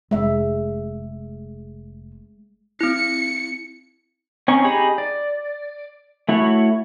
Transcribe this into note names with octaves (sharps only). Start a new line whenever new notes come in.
F1 G#3 E5
C4 E4 C#7
C4 C#4 D#4 C#6
D#4 G4 G#4 D#5 B5
D5
A3 E4 F#4 C#5